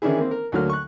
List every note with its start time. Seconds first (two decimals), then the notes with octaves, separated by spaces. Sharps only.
0.02 D#3 E3 C#4 D4 E4 G#4
0.18 A#3 C4
0.31 A#4
0.52 D2 D3 F#3 A#3 F6
0.70 C#6 F#6